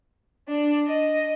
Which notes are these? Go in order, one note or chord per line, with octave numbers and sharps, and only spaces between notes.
D4
D#5